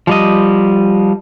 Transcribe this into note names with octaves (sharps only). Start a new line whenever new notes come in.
F3 G3 D#5